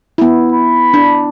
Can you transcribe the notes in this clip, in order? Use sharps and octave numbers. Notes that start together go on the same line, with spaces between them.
B3 E4
B5
D4